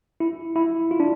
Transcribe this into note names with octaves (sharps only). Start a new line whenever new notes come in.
E4
E4
F4
D4